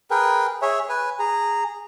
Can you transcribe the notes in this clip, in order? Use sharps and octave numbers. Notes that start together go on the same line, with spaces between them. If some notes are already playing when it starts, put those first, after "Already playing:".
G#4 A#4 B4 G5
G#4 C#5 E5
B4 G#5
G#4 A#5